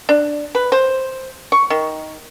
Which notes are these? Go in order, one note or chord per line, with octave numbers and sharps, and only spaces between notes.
D4
B4
C5
C#6
D#3